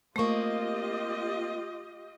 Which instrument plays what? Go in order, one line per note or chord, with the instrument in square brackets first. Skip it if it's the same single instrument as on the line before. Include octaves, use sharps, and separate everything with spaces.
[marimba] A3 C#6 [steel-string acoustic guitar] A#3 C4 [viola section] F4 G4 D#5